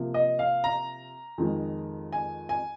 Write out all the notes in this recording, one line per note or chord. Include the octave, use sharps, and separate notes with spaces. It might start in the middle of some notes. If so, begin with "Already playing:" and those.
Already playing: C3 F3 A#3
D#5
F5
A#5
F2 D#3 G#3
G#5
G#5